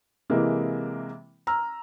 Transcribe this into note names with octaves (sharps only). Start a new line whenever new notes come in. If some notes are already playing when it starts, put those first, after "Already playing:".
C3 E3 G#3 A#3
A#5 E6 F6